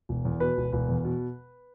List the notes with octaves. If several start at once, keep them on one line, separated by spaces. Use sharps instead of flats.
E1
E2
B2 B4
E1
E1 B4
E2
B2